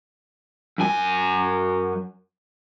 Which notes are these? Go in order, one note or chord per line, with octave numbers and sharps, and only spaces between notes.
F#2 G#5